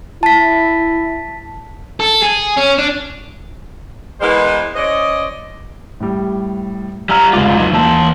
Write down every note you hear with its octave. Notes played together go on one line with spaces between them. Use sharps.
E4 A5 B6
A4
G#4
C#4
D4
E3 G#3 B3 A#4 C5
C#4 C5 D5 D#5
A2 G3
G3 A#5 E6 F6
F1 C#2 G#2 F4 D6
F#3 D#4
D#2 E3 A5 E6